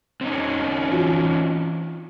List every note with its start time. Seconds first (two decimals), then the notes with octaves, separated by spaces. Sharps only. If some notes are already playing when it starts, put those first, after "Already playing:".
0.21 C4 C#4 D#4
0.91 E3 F4